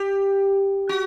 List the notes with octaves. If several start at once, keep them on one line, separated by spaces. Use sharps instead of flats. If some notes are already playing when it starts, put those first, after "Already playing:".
Already playing: G4
F#4